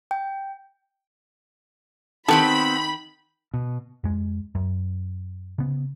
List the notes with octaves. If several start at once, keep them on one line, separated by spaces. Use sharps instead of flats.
G5
D#3 B3 C4 G4 A4 C5 B5
B2
F2 G#3
F#2
C#3 B3